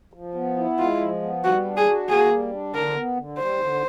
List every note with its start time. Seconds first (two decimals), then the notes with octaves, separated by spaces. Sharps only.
0.14 F3
0.35 B3
0.57 E4
0.78 G#3 F4
1.00 F3
1.22 B3
1.43 G3 F#4
1.65 D4
1.76 G#4
1.87 F#4
2.08 A#3 G#4
2.31 G3
2.52 D4
2.74 D3 A#4
2.96 B3
3.17 D3
3.38 G3 C5
3.60 D3